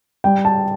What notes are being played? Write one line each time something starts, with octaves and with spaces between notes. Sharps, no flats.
G3 G5
A5